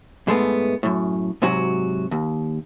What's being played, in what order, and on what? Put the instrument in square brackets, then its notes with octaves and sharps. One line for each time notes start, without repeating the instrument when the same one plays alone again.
[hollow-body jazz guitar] G#2 G#3 A3 B3
F#2 A2
G#2 C3 F#3 F#4
D#2